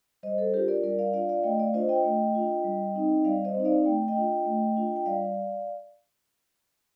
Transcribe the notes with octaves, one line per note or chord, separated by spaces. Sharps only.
G3 C5 D#5
A4 C5
D4 F4 G4 A#4
A#4 D5
G3 A#4 D5
D5 F5
D4 F4 D5 F5
D5 F5
A3 D#5 G5
D5 F5
D4 F4 C5 D#5
D#5 G5
A3
D4 F4
G3
C4 D#4
G3 D5 F5
C5 D#5
C4 D#4
D5 F5
A3 G5
D#5 G5
D4 F4
A3
D4 F4
G5
G3 D5 F5